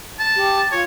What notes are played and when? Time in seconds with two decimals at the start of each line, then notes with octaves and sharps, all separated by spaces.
0.19 A5
0.36 G4
0.72 F4 C#5